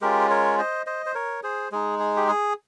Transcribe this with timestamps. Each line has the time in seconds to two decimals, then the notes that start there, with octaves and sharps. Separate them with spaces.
0.01 G#3 C#4 F4 G4 A#4
0.30 A#4 C#5
0.58 C5 D#5
0.86 C5 D#5
1.06 C5
1.15 A#4 C#5
1.43 G#4 C5
1.72 G#3 D#4 G#4
1.99 G#4
2.16 G4
2.28 G#4